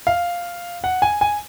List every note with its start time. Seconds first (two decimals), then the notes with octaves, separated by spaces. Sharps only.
0.07 F5
0.84 F#5
1.02 G#5
1.21 G#5